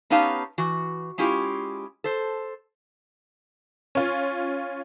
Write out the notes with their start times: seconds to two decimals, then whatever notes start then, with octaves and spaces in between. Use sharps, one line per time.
0.10 B3 C#4 D#4 G4 F5 A5
0.58 E3 F#4
1.18 G#3 C#4 E4 F4 G4
2.04 A4 C5
3.95 C#4 F4